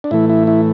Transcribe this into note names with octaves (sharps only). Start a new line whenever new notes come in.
D4
A2 E3 A3 E4
E4
E4